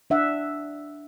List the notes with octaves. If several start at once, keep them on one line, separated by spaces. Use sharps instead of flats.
D4 E5 F#5